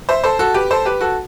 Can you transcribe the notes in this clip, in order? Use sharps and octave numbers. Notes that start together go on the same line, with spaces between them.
C5 E5
A4 C5
F#4 A4
G4 B4
A4 C5
G4 B4
F#4 A4